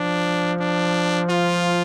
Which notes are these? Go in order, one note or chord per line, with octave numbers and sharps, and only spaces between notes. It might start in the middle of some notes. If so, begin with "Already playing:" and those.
Already playing: F3 D4
D4
F4